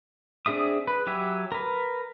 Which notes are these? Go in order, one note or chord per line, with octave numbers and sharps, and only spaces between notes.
C4 D4 G#4 E5 D#6
B4
F#3 G4 E5 G#5
A#4 B4